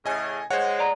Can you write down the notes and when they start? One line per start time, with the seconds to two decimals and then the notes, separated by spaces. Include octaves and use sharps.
0.06 A2 C#3 D#5 G#5
0.50 G#3 C5 C#5 F#5
0.79 D5 A#5